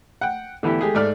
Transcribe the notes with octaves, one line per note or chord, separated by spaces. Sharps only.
F#5 G5
D3 E3 B3 E4 G4
G#3 A3 G4 G#4
G#2 A3 D5 F6